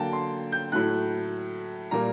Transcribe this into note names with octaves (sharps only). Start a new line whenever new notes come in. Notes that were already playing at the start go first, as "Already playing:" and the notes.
Already playing: D3 F#3 A#3 G5 A5
C6
G6
A2 F#3 A3 F#6
A#2 G3 A#3 A#5